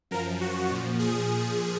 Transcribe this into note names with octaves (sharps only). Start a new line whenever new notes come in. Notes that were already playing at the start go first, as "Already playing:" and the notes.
F#2 F3 A#4
F#4
A#2 F3
G#4